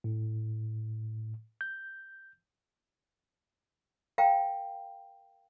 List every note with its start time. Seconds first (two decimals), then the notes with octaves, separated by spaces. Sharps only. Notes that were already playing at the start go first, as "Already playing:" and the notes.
0.04 A2
1.61 G6
4.18 A#4 F5 G5 A#5